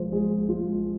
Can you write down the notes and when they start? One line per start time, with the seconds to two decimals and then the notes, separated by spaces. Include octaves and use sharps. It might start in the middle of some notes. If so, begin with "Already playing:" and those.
Already playing: F3 G#3 C5
0.12 G#3 G#4
0.49 G#3 F4